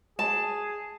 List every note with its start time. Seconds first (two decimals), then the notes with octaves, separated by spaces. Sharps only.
0.19 G#4 A5